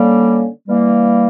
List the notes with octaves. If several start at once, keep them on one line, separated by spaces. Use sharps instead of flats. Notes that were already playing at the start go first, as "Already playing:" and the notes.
Already playing: D3 G3 A#3 C#4
E3 G3 A#3